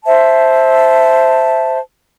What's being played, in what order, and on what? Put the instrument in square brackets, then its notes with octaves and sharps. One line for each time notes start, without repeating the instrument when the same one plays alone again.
[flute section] C5 E5 A5